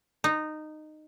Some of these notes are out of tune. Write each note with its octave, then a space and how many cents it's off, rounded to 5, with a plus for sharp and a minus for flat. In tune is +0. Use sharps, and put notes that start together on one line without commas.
D#4 -15